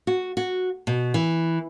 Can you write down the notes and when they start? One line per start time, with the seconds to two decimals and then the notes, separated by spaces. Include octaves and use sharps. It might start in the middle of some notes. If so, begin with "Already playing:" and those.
0.07 F#4
0.37 F#4
0.87 B2
1.14 E3